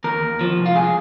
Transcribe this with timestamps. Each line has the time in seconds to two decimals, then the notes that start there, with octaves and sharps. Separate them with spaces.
0.04 D#2 A#4
0.22 D#2
0.40 F3
0.58 C2
0.66 F4
0.75 C2 G#4